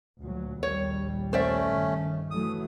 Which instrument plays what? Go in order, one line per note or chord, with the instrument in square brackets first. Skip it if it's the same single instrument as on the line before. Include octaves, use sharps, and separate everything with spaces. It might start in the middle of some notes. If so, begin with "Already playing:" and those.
[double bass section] D2 A#2 F#3
[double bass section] A#1 D#2 G3 [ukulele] C#5
[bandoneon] A3 C#4 [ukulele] C5 D5 E5
[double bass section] G2 D#3
[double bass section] E3 F#3 A3 [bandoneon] D#6